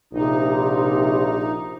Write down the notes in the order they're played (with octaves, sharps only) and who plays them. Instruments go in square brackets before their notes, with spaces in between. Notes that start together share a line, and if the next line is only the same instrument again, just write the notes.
[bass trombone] A#1 [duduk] C3 [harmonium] D#4